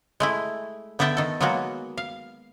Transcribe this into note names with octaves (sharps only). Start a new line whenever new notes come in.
G#3 A3 E4
D3 B3 D5 E5 G5 A5
D#3 A4
F#3 G#3 A#3 B3 F#4
F5